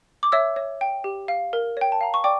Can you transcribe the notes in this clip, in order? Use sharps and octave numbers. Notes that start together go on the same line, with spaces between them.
D6
C#5 E5 E6
C#5
G5
G4
F5
A#4
C#5 G5
A5
F5 A#5
C#6
D5 G5 D6